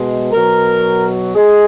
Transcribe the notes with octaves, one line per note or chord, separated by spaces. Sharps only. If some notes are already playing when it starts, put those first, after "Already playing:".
Already playing: B2 G#3
B2 F#3 A#4
G#3 G#4